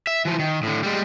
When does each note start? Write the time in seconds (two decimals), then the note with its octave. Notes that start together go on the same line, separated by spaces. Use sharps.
0.07 E5
0.25 E3 F3
0.39 D#3
0.63 A2 D3
0.83 G3 G#3